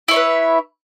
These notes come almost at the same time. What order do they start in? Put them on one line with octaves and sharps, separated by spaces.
E4 C#5 E5 B4